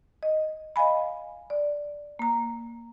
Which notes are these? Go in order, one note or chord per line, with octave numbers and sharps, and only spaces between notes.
D#5
D#5 F5 G#5 B5
D5
A#3 A#5